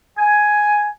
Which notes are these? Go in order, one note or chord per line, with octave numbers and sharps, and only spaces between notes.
G#5